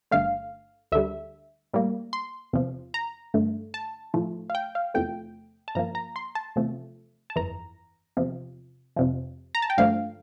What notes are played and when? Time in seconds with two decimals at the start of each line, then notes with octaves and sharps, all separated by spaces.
0.11 G1 G2 D3 A3 F5
0.92 D2 D3 G3 E5
1.74 A2 G3 A#3
2.13 C6
2.53 E2 C3 F3
2.94 A#5
3.34 G2 D3 A3
3.74 A5
4.14 A2 F3 A3
4.50 F5
4.55 G5
4.75 F5
4.94 E2 C3 F3 A3 G5
5.68 A5
5.75 G2 F3 A#3 A#5
5.95 A#5
6.16 C6
6.35 A5
6.56 E2 C3 F3 A3
7.30 A5
7.36 G1 F2 E3 A#5
8.17 E2 C3 F3
8.97 F2 C3 F3
9.55 A#5
9.62 A5
9.70 G5
9.77 G2 D3 F3 A3 F5